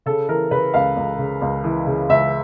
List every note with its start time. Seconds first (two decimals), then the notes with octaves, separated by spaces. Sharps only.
0.06 C#3 A4
0.29 E3 A#4
0.51 C#3 B4
0.74 C#2 F5
0.96 C#2
1.18 C#3
1.41 C#2
1.64 E3
1.87 C#3
2.09 C#2 E5